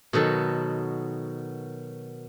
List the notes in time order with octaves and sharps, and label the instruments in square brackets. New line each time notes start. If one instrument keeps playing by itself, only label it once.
[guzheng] B2 D#3 F#3 A4